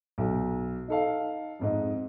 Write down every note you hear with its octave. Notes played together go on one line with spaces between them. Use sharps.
B1
D#4 A4 F5
F2 G#2 D#4